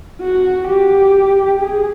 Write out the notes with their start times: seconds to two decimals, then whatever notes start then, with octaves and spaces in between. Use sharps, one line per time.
0.21 F#4
0.67 G4
1.60 G#4